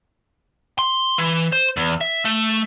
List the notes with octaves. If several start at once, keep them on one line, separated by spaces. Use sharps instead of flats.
C6
E3
C5
E2
E5
A3